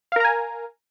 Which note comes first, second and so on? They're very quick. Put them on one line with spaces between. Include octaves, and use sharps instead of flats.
F5 A#4 A#5 G#5